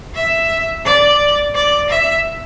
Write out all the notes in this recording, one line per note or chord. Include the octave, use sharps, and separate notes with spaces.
E5
D5
D5
E5